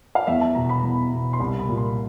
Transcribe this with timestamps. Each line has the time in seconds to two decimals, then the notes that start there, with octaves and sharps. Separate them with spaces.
0.15 F5
0.27 E2 E5
0.41 A5
0.55 B2 A#5
0.69 B5
0.83 E2
1.12 B2
1.33 C6
1.40 C2 B5
1.59 B5
1.69 A#2
1.77 C6